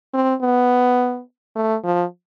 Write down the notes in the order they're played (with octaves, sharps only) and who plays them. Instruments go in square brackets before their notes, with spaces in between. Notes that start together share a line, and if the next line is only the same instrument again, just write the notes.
[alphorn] C4
B3
A3
F3